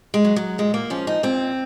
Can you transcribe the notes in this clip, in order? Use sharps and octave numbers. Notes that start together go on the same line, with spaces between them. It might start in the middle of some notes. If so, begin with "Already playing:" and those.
G#3
F#3
F#3
A#2 G#3
A#3
F3 C#4
D#4
A#2 C4